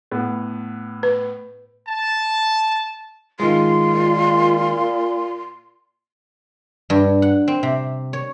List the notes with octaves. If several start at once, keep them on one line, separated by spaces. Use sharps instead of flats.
A2 B3
B4
A5
D#3 G#3 F4 C6
A#2
G2
F#5
C4
C3
C#5